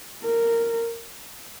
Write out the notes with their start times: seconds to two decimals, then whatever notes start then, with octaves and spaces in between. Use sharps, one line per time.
0.23 A#4